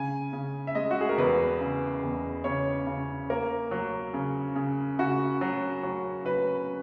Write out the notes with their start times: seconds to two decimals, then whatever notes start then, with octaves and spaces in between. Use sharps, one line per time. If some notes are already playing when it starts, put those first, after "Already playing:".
Already playing: C#3 G#5
0.33 C#3
0.67 E5
0.75 G#3 D#5
0.91 F#4
1.01 G#4
1.09 A#4
1.18 E2 B4
1.61 C#3
2.03 E2
2.44 C#3 C#5
2.87 C#3
3.30 A#3 A#4
3.71 F#3
4.14 C#3
4.56 C#3
4.99 C#3 F#4
5.41 F#3
5.83 F#3
6.25 F#3 B4